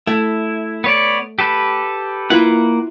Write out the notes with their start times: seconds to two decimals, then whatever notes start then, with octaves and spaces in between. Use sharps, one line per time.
0.07 A3 E4
0.84 B3 C#5 D5
1.39 G4 A4 B4
2.30 A#3 E4 F4 B4 F#5